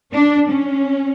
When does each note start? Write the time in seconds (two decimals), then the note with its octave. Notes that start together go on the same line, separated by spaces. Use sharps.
0.12 D4
0.50 C#4